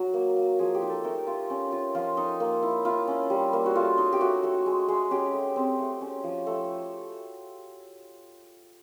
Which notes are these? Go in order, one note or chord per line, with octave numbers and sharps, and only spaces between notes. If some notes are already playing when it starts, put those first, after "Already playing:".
Already playing: F#3 F#4
A#3
A#3
F3 G#4
G4
D#4
A4
A3 A#4
F4
C#4
F4
F3 F4
D#4
A#3
E4
E4 F4
C#4
G3
A#3
F#4
A3 F4
D#4
G4
A3 F#4
A3
G#3
G#3
C#4 G4
A3
C4
A3
C#4
F3
A3